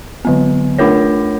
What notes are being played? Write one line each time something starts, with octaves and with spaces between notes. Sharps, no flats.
D3 F#3 B3
A3 D4 F4 A#4 C#5